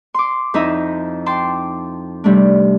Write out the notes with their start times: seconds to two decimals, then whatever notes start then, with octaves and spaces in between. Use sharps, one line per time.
0.14 C6 D6
0.54 F2 D#4 E4 D#5 E5
1.26 G5 A5 C6 D6
2.24 C3 G3 A3 D4